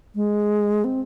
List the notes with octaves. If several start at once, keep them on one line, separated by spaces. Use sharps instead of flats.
G#3
C4